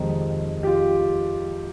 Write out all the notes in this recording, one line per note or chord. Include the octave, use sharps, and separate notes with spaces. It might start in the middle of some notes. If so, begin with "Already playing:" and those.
Already playing: F2 C3 D#3 G#3 D#4
G4
F4